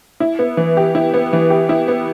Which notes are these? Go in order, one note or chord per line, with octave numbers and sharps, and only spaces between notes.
E4
B3
E3
G4
E4
B3
E3
G4
E4
B3